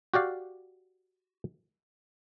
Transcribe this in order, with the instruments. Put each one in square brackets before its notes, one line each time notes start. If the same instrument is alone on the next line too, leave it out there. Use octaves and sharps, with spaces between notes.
[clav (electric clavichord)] F#4 G4 D5 F5